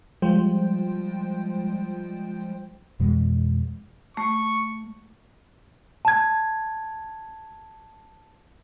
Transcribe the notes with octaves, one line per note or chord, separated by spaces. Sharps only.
F3 G3 G#3 F4 C5 G5
F2 B2 E3 G#3
A3 C#6
A5 G#6